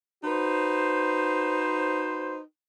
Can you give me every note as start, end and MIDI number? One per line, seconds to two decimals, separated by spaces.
0.24 2.39 63
0.24 2.39 66
0.24 2.39 71
0.24 2.39 72